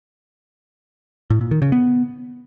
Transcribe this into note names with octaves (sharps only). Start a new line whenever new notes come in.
A2
A#2
D#3
C#3
B3